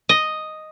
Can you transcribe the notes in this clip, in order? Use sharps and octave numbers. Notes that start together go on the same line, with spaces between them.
D#5